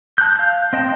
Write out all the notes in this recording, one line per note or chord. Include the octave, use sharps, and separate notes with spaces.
A5 F#6 G6
F5 G6
C4 D#5 G5 A5